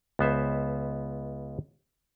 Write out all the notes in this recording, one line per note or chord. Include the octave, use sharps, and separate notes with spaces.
C#2 B3 C5 E5